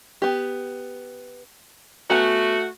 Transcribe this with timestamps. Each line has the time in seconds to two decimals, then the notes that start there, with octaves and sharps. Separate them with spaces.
0.22 B3 G4
2.10 A3 B3 F#4 G#5 A#5